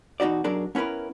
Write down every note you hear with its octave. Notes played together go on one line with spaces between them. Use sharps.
E2 B2 D#4 F#4 D5
B1 F#3 D4 G#4 A#4 D5
B3 C#4 E4 A#4 B4